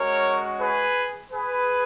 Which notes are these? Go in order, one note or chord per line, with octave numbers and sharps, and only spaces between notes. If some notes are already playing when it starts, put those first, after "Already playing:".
Already playing: G#3 C#4 F#4 A#4 C#5
G#4 B4
G#4 B4